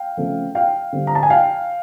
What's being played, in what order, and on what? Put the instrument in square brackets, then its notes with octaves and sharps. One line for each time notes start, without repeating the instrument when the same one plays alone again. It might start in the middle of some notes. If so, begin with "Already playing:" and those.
Already playing: [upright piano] F5 G5
C#3 F3 A3 C4
F5 G5
D3 G3 C4
A#5
A5
G#5
F5 G5